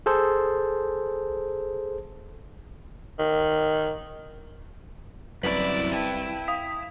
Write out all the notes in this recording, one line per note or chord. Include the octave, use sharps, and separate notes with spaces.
G#4 A4 C5
D#3
C2 F#2 E4 B4 D5
E4 G5 A5
F5 D#6 B6